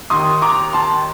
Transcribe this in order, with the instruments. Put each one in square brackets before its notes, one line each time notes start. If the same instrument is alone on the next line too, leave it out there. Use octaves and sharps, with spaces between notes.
[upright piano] D#2 D#3 C6 D#6
A#5 D6
A5 C6